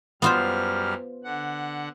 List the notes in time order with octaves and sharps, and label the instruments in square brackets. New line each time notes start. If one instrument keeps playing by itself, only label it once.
[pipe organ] F#2 G3 F6 [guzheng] B3 F4 C5
[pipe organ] D3 F#5